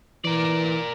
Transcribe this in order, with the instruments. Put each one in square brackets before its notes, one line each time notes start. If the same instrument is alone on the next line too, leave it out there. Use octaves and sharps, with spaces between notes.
[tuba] E3 [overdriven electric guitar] A#4 D5